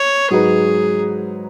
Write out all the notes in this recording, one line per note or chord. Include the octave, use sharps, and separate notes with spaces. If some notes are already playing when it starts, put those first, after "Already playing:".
Already playing: C#5
G#2 F#3 D#4 G#4 B4